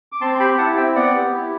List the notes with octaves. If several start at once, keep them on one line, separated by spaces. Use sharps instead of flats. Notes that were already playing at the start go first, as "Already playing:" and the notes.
D6
C4 A5 C6
C6
G4 G5 B5
E4 F#5 A5
C4 E5 G5
B3 D5 F#5
G4
E4